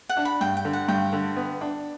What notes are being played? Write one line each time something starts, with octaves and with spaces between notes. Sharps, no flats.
F#5
D4
B5
G2 G5
G5
D3
F#5
G2 G5
D3
B3
D4